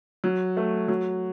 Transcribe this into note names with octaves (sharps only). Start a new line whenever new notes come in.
F#3
A3
F#3